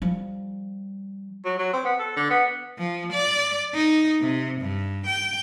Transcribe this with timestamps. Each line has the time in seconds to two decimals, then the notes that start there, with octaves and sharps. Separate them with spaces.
0.02 F3 G3
1.45 F#3
1.59 F#3
1.73 C4
1.85 B3
1.99 A4
2.17 D3
2.30 B3
2.78 F3
3.13 D5
3.74 D#4
4.21 C3
4.61 G2
5.06 G5